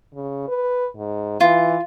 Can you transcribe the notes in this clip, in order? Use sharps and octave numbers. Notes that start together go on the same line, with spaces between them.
C#3
B4
G#2
E3 F4